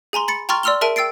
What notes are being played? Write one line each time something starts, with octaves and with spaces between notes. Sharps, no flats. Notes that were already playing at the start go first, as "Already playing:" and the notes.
G#4 G#5 A#5 C6
B5 A6 C#7
G5 A#5 C6 C#6 F6 A6
D5 C6 E6 F6 F7 G7
G#4 A#4 E5 A5 D7 D#7
G5 E6 A6 C7 D7